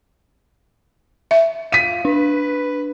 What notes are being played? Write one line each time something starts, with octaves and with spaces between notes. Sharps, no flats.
E5
F4 F5 B6 D#7
D4 B4